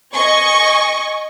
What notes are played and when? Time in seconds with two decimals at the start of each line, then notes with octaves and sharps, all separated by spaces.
0.14 D#5 G#5 C#6